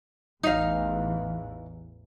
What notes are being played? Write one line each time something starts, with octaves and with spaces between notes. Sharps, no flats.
A1 E2 E3 D#4 F5